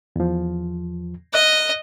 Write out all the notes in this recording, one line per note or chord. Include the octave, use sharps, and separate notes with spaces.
E2 F3
D#5 F#6